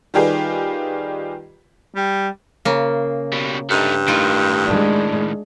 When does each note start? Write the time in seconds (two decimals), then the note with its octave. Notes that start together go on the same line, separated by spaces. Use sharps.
0.14 D#3 G3 F4 G4 G#4 B4
1.96 G3
2.65 C#3 A#3
3.33 B2 G3
3.70 G2 A3 D#4
4.08 A2 D#3 D#4 F4
4.64 G#3 D4